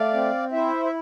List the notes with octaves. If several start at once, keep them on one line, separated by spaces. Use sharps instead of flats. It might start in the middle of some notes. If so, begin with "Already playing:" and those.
Already playing: A3 D5 F5
C4
E4 C5 E5
E5